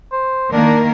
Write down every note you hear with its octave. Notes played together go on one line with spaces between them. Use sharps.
C5
D#3 A#3 D4 A#4